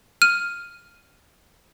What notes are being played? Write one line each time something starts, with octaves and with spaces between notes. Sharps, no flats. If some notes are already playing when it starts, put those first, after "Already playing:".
F6 D#7